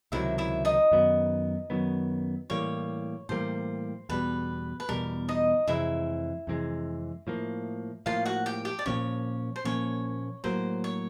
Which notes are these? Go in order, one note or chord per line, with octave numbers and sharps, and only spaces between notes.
C#2 C3 D#3 F#3 E4 E5
E4 E5
D#4 D#5
F#2 D#3 F#3 B3
F#2 D#3 F#3 B3
A2 E3 G3 A#3 C#5
A2 E3 G3 A#3 C5
E2 B2 G3 B4
B4
E2 B2 G3 A#4
D#4 D#5
F2 C3 E3 G#3 E4 E5
F2 C3 E3 G#3
A2 F3 A#3
A2 F3 A#3 F4 F5
F#4 F#5
G4 G5
G4 G5
D5
A#2 F3 A#3 C#4 C#5
C5
A#2 F3 A#3 C#4 C#5
A2 F#3 A#3 C5
C#5